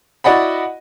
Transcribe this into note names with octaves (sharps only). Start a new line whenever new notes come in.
E4 F#4 D5 D#5 F#5 B5